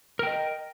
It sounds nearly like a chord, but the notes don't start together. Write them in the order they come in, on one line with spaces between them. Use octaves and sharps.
A#4 G5 D#5